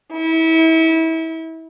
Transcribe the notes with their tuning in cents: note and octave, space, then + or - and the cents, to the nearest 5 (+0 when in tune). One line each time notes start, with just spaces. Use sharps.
E4 -30